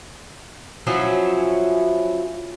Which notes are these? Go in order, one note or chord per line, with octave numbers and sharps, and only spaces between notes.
F3 F#3 C#4 E4